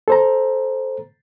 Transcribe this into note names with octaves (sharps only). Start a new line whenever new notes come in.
A4 C5 A#5